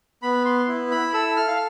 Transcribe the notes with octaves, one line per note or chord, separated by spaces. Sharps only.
B3 B5
C6
E4
B5
A4 E6
F6
F5